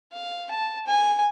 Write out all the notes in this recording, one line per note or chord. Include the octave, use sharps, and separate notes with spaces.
F5
A5
G#5